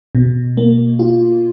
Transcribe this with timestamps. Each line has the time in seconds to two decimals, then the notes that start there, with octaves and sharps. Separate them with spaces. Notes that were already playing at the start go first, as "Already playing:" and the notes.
0.15 B2
0.57 A#3
0.99 F4